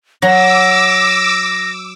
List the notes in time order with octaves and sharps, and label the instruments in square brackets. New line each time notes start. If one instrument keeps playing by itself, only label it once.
[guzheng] F#3 [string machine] D6 E6 [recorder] A#6